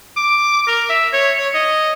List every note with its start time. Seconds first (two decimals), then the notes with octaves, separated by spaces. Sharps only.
0.17 D6
0.68 A#4
0.89 E5
1.13 C#5
1.38 C#5
1.54 D#5